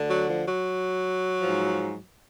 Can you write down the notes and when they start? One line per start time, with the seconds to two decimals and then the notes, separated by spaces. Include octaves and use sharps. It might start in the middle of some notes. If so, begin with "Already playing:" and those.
Already playing: D2 D3
0.09 F#3
0.29 F3
0.47 F#3
1.42 G#2 F3